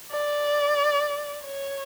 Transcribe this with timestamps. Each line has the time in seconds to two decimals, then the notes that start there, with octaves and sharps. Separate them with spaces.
0.12 D5
1.45 C#5